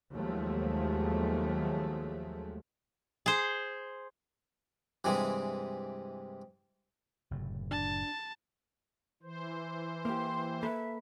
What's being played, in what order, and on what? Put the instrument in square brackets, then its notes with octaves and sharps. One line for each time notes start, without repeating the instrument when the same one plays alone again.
[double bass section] D#2 F3 F#3 G#3 A3
[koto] G#4 C5
[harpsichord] G2 C3 E3 G#3
[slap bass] F#1 A2 C3
[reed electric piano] D4 [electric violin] A5
[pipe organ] E3 C5
[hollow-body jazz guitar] A#3 G4 [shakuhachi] C6
[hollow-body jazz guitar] A#3 A4 B4 [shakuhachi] E5